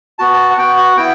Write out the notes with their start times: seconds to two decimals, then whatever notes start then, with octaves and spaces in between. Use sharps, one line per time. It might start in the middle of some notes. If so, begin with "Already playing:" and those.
0.19 B3 F#4 A5
0.34 A5
0.50 F#5
0.58 B3 F#4 G5
0.77 F#5
0.97 B3 E4 G5